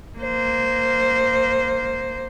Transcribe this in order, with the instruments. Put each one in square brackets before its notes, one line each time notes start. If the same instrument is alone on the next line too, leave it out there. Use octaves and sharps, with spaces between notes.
[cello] A#3 C5